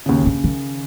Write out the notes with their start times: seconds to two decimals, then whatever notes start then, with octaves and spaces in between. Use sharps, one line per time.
0.06 D#2 C#3
0.23 C#3 A#3 D4
0.44 D#3